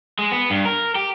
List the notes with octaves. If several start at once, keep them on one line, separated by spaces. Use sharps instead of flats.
G#3
B3
G2
A#4
G4